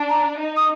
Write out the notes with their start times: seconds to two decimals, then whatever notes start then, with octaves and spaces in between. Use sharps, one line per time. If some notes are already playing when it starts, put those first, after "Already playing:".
Already playing: D4
0.10 A#5
0.39 D#4
0.56 D#6